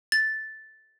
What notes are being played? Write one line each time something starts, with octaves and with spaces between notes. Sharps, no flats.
A6